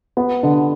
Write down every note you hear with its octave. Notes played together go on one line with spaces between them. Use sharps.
B3
D3